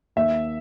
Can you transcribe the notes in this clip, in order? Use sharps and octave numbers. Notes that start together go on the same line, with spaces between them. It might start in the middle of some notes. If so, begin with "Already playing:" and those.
D#2 E5